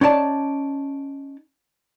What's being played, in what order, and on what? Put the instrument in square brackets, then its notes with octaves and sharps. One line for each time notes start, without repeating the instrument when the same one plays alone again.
[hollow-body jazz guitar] C#4 D#4 D5 A5